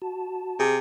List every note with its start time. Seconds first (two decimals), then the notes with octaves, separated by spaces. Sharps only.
0.02 F#4 A5
0.60 C3 G#4